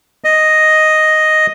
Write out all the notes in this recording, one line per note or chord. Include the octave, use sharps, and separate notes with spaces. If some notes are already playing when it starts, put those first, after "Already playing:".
D#5